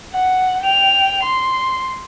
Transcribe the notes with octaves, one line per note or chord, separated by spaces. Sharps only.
F#5
G5 F7
C6